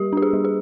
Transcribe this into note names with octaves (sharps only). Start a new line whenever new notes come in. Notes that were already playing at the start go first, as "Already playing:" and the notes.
Already playing: G3 G4
D4 G4
G#4
G3
G#4